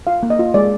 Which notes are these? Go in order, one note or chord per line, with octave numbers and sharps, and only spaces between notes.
F4 F5
A#3
D#5
F4
G#3 D5